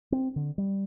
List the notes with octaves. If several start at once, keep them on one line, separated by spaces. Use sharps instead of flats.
C4
D3
G3